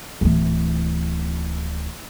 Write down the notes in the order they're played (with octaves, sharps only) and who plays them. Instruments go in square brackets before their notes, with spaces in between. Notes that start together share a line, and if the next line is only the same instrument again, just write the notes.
[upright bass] D1 E3